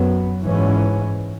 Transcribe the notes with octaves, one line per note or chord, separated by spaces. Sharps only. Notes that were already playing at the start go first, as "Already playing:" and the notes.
Already playing: F#2 F#3 B3
G#2 E3 C#4